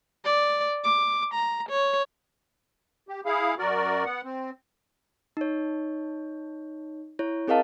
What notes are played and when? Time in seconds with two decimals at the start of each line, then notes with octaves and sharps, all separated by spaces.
0.25 D5
0.84 D6
1.34 A#5
1.70 C#5
3.08 G4
3.25 E4 G#4 F5
3.59 F#2 F#4 A#4 D5
4.05 B3 F#5
4.24 C4
5.37 D#4 C#5
7.19 E4 C#5
7.48 C4 G#4 A#4 D#5 F5 A5